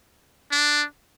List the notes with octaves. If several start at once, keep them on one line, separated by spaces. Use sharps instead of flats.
D4